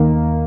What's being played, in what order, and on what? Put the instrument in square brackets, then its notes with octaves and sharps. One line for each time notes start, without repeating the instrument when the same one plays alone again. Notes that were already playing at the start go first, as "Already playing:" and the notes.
Already playing: [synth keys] D#2 D#3 A#3